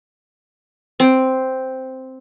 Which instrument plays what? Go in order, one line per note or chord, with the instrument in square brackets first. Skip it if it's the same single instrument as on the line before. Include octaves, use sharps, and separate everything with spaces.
[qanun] C4